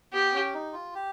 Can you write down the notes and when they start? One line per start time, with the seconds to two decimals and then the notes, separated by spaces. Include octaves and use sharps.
0.13 B3 G4
0.33 C#4
0.54 D#4
0.73 F4
0.94 G4